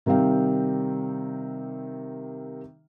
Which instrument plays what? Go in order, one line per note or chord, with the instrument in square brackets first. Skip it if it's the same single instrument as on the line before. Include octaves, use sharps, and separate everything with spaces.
[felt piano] C3 D#3 G3 C4 F5 G5